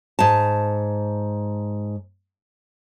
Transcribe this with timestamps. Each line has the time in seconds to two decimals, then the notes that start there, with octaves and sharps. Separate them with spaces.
0.19 G#2 A5